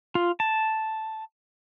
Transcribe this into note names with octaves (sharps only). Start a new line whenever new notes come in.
F4
A5